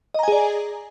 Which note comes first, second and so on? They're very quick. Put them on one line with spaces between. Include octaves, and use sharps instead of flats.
D#5 A#5 G#5 G#4 D5